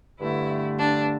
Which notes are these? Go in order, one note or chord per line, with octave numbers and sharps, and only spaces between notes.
G2 D3 A3 E4
D4